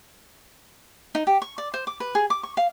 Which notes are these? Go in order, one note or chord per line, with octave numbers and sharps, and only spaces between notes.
D#4
G4
C#6
D5
C5
D6
B4
G#4
D6
C#6
F5